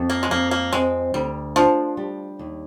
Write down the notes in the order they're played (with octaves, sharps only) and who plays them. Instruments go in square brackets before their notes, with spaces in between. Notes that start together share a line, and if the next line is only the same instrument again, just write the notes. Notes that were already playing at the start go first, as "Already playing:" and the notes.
Already playing: [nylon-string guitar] F2
[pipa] A#3
G#3
[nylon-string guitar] F2 [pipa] A#3
[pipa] A#3
[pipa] G#3 [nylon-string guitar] C4
[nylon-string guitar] D2 [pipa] G3
[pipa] F3 [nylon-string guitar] D4
[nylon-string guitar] G3
D#2